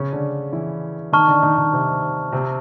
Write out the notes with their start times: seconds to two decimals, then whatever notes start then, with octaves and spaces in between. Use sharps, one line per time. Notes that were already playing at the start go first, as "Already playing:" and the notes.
Already playing: C#3 C#4
0.12 D3 D4
0.53 E3 E4
1.12 D#3 D#4 A5 C#6 F6
1.28 D3 D4
1.42 D#3 D#4
1.58 D#3 D#4
1.73 C3 C4
2.32 C3 C4